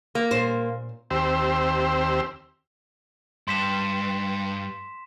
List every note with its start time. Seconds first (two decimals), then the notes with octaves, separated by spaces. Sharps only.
0.15 A#3
0.31 A#2 C5
1.11 D#2 C4 G4 C5 E6
3.48 G2 C6 B6 E7